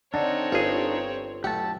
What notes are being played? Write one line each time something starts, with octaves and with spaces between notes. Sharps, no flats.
D3 C4 D4 D#4 A4 C#5
G1 F4 G#4 D#5
B1 A3 G4 F#5 A5